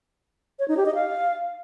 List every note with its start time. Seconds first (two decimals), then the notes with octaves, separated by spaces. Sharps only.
0.59 C#5
0.68 D#4
0.77 G4
0.86 D#5
0.95 F5